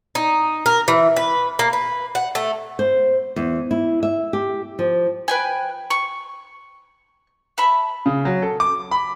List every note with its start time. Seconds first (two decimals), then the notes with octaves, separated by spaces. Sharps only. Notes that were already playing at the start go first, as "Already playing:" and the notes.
0.15 D#4
0.66 A#4
0.88 E3
1.16 B4
1.59 A#3
1.73 B4
2.15 F#5
2.35 A3
2.79 C5
3.36 E2
3.71 E4
4.03 E5
4.33 G4
4.79 F3
5.28 B4 G5 G#5
5.90 C#6
7.58 E5 A5 B5
8.06 C#3
8.25 F#3
8.42 A4
8.60 D6
8.91 B5